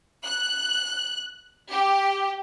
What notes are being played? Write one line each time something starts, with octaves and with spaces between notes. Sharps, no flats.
F#6
G4